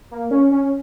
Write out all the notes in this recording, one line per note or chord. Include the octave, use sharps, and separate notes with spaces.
A#3
C#4
C#4